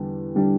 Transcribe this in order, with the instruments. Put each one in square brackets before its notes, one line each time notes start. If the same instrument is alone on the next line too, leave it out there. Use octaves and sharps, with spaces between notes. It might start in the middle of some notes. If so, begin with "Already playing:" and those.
Already playing: [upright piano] E2 D3 G3 D4
D3 G3 D4